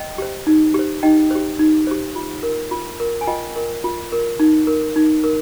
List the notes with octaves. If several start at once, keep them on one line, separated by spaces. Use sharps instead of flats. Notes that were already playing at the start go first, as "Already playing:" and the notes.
Already playing: D#5 G5
G4 C5
D#4
G4 C5
D#4 D#5 G5
G4 C5
D#4
G4 C5
F4
A#4
F4
A#4
G#5
F4 D#5 G5
A#4
F4
A#4
D#4
A#4
D#4
A#4